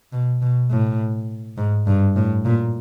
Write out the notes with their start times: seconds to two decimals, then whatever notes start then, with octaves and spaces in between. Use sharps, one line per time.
0.12 B2
0.42 B2
0.70 A2
1.57 G#2
1.87 G2
2.16 A2
2.45 A#2